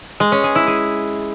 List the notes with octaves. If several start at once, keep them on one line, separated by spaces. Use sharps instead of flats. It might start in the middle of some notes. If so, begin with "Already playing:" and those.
G#3
C#4
G#4
E4
G#4